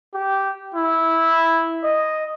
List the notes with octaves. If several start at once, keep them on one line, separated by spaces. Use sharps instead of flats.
G4
E4
D#5